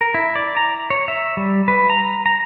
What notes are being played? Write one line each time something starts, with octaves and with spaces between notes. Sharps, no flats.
A#4
E4
D5
A#5
C#5
E5
G3
B4
A#5
A#5